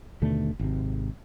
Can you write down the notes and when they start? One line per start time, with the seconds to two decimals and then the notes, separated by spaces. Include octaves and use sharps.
0.22 D#2 B2 D3 A3
0.59 G#1 C3